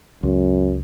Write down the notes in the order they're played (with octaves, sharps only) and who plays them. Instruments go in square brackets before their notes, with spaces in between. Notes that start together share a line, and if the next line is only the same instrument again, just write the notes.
[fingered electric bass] C#2 [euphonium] F#2